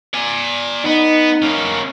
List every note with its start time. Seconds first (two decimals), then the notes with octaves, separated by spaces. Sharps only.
0.14 D5 G#5
0.85 B3 D#4
1.42 A#3 C#4